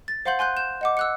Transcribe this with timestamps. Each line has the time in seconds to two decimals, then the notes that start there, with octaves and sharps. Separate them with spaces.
0.08 A6
0.25 C5 F5 F#5 C6 G6 F#7
0.39 G#5 C6 F#6 G6
0.57 G6 E7
0.81 D#5 F#5 D6
0.97 E6 F#6 C#7